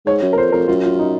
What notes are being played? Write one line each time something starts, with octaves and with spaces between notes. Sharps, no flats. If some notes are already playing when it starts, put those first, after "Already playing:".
G#2 C#5
F#2
A#4
F2 C5
F2 A#4
F#2 F4
F4
D#4